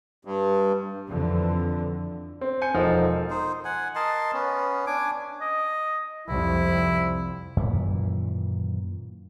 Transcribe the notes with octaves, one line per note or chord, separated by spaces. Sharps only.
G2
F2 D3 E3
C4
G#5 G6 C#7
E1 F3 D#4 A4 A#4 F#5
A4
D#4 C5
F#5 G#5
A#4 D#5 A5 C6
B3 C#4
D4 G#5 D6
D#5
C2 F2 E4
F#2 A#2 D#3 E3